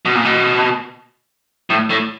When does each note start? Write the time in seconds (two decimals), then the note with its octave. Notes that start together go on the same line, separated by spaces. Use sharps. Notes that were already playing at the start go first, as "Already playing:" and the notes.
0.05 B2
0.15 A#2
0.25 B2
1.70 A2
1.90 A2